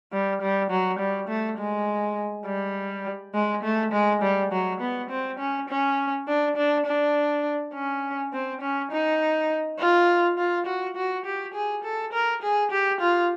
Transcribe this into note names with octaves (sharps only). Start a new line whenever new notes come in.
G3
G3
F#3
G3
A3
G#3
G3
G#3
A3
G#3
G3
F#3
B3
C4
C#4
C#4
D4
D4
D4
C#4
C4
C#4
D#4
F4
F4
F#4
F#4
G4
G#4
A4
A#4
G#4
G4
F4